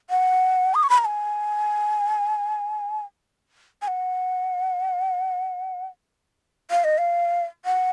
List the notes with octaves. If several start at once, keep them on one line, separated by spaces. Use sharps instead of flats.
F#5
D#6
C#6
B5
A#5
G#5
G#5
F#5
F5
D#5
F5
F#5